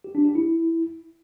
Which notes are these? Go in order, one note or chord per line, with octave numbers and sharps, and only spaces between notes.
G4
D4
G4
E4